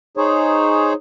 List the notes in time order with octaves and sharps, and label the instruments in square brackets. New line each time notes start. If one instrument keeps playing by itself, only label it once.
[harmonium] D#4 G#4 C5 C#5